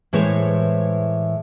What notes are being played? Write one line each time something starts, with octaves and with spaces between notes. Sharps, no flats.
A2 E3 G#3 C5 C#5